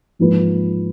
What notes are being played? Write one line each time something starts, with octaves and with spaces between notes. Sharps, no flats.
G#2 F3 A#3 F4 B4